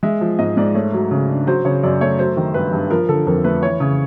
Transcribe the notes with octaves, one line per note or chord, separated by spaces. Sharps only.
G#3 E5
F3
G#2 D#5
G#2 D5
A3 C#5
F#3
C#3
D4
F#3 C5
C#3 C#5
F#2 D5
A3 C#5
F#3 C5
D#3
G2 B4
G2
F3 A#4
D3 A4
F2 A#4
A3 B4
E3 C#5
C#3